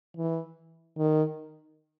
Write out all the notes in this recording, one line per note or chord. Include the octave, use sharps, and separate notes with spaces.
E3
D#3